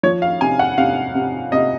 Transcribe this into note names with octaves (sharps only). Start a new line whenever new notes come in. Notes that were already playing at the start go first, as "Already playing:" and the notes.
F3 C#5
F5
C3 G#5
F#5
C3 F5
C3
C3 D#5